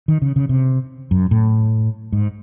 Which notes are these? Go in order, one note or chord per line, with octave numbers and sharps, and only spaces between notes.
D#3
C#3
C#3
C3
F#2
A2
G#2